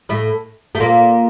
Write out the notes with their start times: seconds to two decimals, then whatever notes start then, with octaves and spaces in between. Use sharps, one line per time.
0.09 A2 A3
0.75 A3
0.80 A#2 A#3